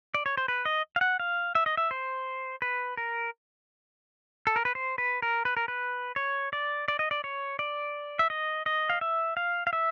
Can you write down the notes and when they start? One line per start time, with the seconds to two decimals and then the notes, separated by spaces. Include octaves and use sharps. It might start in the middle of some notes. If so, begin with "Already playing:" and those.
0.14 D5
0.26 C#5
0.37 C5
0.48 B4
0.65 D#5
0.96 F5
1.01 F#5
1.20 F5
1.55 E5
1.66 D#5
1.77 E5
1.91 C5
2.62 B4
2.97 A#4
4.47 A4
4.56 A#4
4.65 B4
4.75 C5
4.98 B4
5.22 A#4
5.45 B4
5.57 A#4
5.68 B4
6.16 C#5
6.53 D5
6.88 D5
6.99 D#5
7.11 D5
7.24 C#5
7.59 D5
8.19 E5
8.30 D#5
8.66 D#5
8.90 F5
9.01 E5
9.37 F5
9.67 F5
9.73 E5